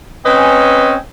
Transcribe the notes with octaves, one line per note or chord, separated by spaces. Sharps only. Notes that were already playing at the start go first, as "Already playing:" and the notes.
C4 C#4 B4 D#5 G#5